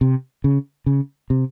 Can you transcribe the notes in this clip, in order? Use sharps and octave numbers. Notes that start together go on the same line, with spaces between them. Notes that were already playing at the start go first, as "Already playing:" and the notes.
C3
C#3
C#3
C3